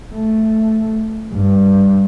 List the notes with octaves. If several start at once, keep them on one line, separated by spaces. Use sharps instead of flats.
A3
G2